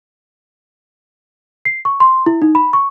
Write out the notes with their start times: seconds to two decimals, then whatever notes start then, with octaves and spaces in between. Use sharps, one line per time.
1.65 C7
1.85 C#6
2.00 C6
2.26 E4
2.42 D#4
2.55 B5
2.73 C#6